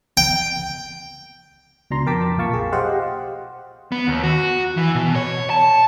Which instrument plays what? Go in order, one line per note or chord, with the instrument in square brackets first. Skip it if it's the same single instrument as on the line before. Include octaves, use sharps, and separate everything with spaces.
[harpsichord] G5
[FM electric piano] C#2 B2 D4 A#5 C6
F2 A#4 G5 A5 D6 B6
B1 A#2 F5 A5 C#6
G#4
G4 C5 D#5 F5 F#5
[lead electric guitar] B3
D#2
F#4
E3
B2
C#5
A5